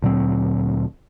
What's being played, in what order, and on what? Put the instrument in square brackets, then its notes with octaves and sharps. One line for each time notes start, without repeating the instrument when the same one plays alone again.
[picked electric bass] D2 A#2 F#3 C4